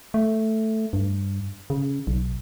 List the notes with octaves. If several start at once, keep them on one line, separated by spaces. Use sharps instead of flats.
A3
G2
C#3
B1